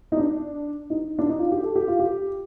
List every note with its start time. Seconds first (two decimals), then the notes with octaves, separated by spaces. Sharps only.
0.12 D#4
0.17 D4
0.90 D#4
1.19 D4
1.29 D#4
1.39 F4
1.52 G4
1.63 A4
1.76 G4
1.88 F4
1.99 G4